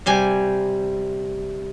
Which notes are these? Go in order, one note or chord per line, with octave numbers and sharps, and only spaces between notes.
C3 G3 G#5